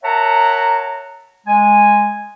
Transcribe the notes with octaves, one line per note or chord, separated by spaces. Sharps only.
A#4 C#5 E5 F#5 A5 A#5
G#3 G#5